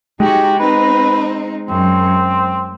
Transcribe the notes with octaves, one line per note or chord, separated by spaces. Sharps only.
G#3 D#4 F#4 G4
C4 D#4 B4
F#2 C4